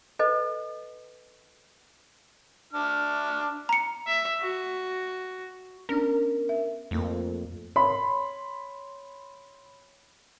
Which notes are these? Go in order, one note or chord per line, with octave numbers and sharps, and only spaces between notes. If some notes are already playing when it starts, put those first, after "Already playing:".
A4 B4 D#5
D4 F6
A#5 C#7
E5
F#4
B3 C#4 D4 A#4
E5
F2 A3 A#3 F4
C#5 B5 C6